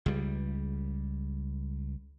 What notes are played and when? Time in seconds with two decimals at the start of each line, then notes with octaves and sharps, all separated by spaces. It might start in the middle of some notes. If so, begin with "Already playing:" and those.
0.06 C#2 G3